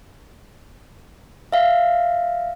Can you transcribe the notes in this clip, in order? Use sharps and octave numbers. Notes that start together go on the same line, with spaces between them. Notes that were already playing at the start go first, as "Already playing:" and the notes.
E5 F5